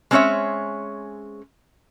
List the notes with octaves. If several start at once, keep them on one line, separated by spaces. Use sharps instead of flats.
G#3 C4 C#4 C5 C#5 E5